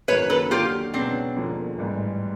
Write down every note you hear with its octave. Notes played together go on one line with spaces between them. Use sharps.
F#2 D#3 F#3 A#3 B4 C#5
A4 B4
D#2 D3 F#3 F4 G4
C#2 B2 F#3 B3 C4 D4
E1 D#2 D3 F3 A#3
A1 G#2 E3 G3